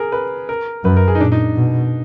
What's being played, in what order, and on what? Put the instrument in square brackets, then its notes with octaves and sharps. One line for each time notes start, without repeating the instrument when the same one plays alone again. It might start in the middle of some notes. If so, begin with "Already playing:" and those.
Already playing: [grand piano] G#4 A#4
B4
A#4
[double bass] F#2 [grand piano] B4
[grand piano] A#4
G#4
D#4
[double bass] A#2 [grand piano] D4
[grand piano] D#4
[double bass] B2